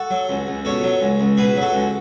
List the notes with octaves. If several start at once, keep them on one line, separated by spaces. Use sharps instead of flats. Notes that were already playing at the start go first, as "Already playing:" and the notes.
Already playing: F#4 A4
F#3
C#2
C#2
B2 A4 C#5
F#3
C#2
C#2
B2 G#4 B4
F#3
F#4 A4
C#2